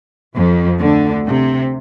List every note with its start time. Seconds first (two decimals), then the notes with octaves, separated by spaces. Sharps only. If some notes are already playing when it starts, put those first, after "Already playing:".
0.36 F2 F3
0.81 D2 D3
1.26 C3